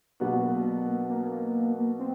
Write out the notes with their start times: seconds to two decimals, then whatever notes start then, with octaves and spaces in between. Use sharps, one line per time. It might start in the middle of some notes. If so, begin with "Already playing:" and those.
0.20 B2 F#3 A#3 B3 D4 F#4
1.10 A#3
1.99 C4